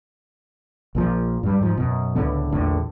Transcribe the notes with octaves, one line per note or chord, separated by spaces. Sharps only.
A#1 A#2 F3
G2 G3
G#2 F3
F#2 B2
C#2 A2 D3 B3
A#1 E2 A2 D3